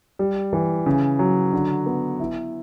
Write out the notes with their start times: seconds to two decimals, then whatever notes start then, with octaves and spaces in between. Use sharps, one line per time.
0.19 G3
0.53 E3
0.86 C#3
1.19 F#3
1.53 D3
1.86 B3
2.20 E4